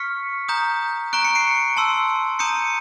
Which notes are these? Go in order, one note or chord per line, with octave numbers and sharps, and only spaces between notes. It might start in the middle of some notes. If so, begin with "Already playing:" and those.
Already playing: C#6 F6 B6 C#7
A#5 D#6 G6
A#5 C#6 F#6 D7
C#7
C7 D7
A5 C6 E6
A#5 D#6 G6 C#7 D#7